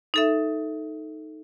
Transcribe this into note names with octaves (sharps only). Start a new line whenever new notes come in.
D#4 A4 E5